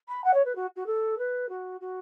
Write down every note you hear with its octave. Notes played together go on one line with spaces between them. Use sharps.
B5
F#5
C#5
B4
F#4
F#4
A4
B4
F#4
F#4